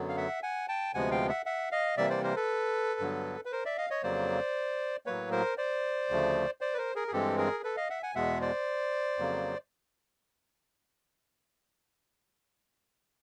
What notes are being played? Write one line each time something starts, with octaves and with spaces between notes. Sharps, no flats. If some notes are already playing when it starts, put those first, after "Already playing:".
Already playing: F#2 D3 F#3 B3
F5
E5 F#5
F#5 G#5
G5 A5
D2 C3 F3 G#3 B3 F#5 G#5
F5 G5
E5 F#5
E5 F#5
D#5 F5
C3 E3 G3 A#3 D5 E5
C5 D5
A#4 C5
A4 B4
G2 D3 F#3 B3
B4
A#4 C5
D5 E5
D#5 F5
C#5 D#5
F2 C#3 F#3 A#3 C5 D5
A2 F#3 A#3 B4 C#5
A#4 C5
C5 D5
D2 C#3 F3 A3
C5 D5
B4
A#4 C5
G#4 A#4
G#4
G2 E3 G#3 C4 G4 A4
G#4 A#4
A4 B4
D#5 F5
E5 F#5
F#5 G#5
E2 B2 G#3 B3 E5 F#5
C5 D5
F2 C#3 F#3 A#3